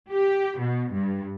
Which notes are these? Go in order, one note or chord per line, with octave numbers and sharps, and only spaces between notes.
G4
B2
G2